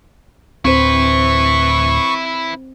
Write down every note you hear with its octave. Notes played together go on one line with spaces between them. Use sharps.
D1 C4 E4 B4 C5 C#6